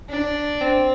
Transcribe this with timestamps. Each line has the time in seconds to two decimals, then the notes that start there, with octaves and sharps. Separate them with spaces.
0.10 D4
0.60 C4